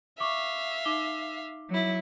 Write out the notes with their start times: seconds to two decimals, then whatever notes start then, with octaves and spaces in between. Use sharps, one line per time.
0.20 E5 F5 C#6 D6
0.85 D#4 D6 G7
1.70 F#3 E4